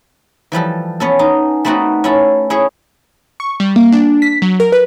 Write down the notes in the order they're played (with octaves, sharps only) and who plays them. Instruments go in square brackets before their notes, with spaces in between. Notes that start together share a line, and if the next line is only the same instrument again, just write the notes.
[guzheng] E3 F3 G3 A4
B3 C#4 A4
D#4
A3 B3 C4 D#4 F#4
C#4 E4 A4
C#4 E4 G#4 C#5
[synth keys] C#6
G3
A#3
D4
B6
F#3
A#4
B4